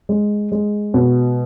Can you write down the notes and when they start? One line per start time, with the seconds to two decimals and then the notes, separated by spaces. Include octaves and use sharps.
0.09 G#3
0.52 G#3
0.94 B2